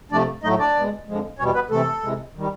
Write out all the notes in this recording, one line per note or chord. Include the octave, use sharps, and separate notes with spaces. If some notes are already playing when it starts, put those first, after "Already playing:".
C3 F3 A3 D4 D5
A2 F#3 A3 D#4 D#5
D4 D5
B2 G#3
F2 D3 F3 G#3
E2 B2 G3 C#4 C#5
B3 B4
C3 E3 A3 A4
C3 E3 G#3
D#3 G3